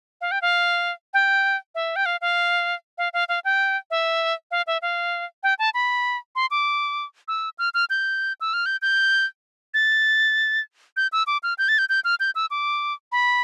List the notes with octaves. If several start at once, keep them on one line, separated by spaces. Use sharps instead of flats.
F5
G5
F5
G5
E5
G5
F5
F5
F5
F5
F5
G5
E5
F5
E5
F5
G5
A5
B5
C6
D6
E6
F6
F6
G6
E6
F6
G6
G6
A6
G6
E6
D6
F6
G6
A6
G6
G6
F6
G6
E6
D6
B5